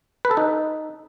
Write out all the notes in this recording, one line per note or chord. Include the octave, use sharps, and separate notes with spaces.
B4
A4
D#4